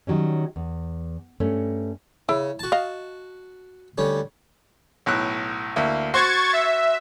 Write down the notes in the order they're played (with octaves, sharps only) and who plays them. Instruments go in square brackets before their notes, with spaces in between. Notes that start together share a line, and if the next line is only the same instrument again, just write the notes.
[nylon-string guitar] D#3 F#3 G3 C#4
E2
G2 A3 C#4
[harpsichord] C#3 [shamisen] E4
[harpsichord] F#4 A5
[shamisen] D#5 F5
[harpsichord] D2 G3 C#4
[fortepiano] B1 A2 F#6
D2 A#3 E4
[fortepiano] F#4 C5 [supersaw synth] C#6 G#6 A6
[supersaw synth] E5